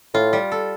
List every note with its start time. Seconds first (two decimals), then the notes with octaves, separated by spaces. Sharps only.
0.14 A2 F4
0.33 G3
0.52 A4